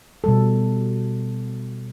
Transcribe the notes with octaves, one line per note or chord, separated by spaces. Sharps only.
B2 G3 A4